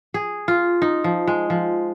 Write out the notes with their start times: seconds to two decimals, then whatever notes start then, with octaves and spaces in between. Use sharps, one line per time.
0.14 G#4
0.48 F4
0.82 D#4
1.04 F3
1.28 G#3
1.50 F3